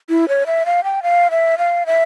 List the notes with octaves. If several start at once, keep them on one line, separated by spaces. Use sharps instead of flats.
E4
C#5
E5
F5
G5
F5
E5
F5
E5